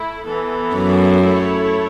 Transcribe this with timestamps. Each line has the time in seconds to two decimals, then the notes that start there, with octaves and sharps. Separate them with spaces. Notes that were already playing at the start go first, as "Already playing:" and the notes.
Already playing: A3 E4
0.26 E3 B3 A4
0.74 F#2
1.23 A3 E4 A4 C#5